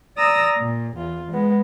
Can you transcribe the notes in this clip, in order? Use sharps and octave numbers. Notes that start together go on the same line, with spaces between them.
D5 A#5 D#6 E6 A#6
A#2
E2 F4
G#3 B3